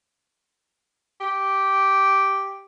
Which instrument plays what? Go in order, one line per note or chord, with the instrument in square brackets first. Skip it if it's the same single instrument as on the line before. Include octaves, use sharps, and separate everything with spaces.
[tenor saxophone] G4